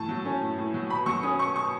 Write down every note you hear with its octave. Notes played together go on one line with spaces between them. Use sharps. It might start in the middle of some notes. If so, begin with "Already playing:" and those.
Already playing: A2 E3 A5
F#3
C#4
A2
A2
F#3
B2 B5
F#3 C#6
C#4 D#6
B2 C#6
B2 C#6